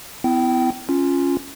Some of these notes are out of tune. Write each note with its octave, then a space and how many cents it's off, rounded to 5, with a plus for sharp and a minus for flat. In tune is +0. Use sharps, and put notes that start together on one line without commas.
B3 +35 E4 +0 G5 -25
C#4 +0 F4 +0